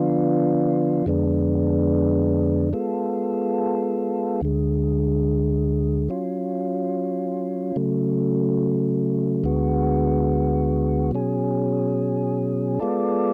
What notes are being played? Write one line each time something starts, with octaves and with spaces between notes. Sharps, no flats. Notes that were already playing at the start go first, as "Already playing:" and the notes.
Already playing: D3 F3 B3 D4 F4
F2 D3 G#3 B3 D4
G#3 B3 F4 A4
D2 D3 G#3
F#3 C#4 F4
C#3 F#3 A3
D2 D3 G#3 B3 F#4
B2 F#3 C#4 G#4
G#3 B3 F4 A4 D5